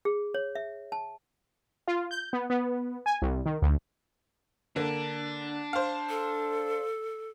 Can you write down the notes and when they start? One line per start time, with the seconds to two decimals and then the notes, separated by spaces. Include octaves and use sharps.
0.05 G#4
0.34 C#5
0.55 E5
0.92 A5
1.88 F4
2.11 G6
2.33 B3
2.50 B3
3.06 G#5
3.22 C2
3.46 D#3
3.62 D2
4.76 D3 A#3 D4
5.73 C5 F5
6.10 A4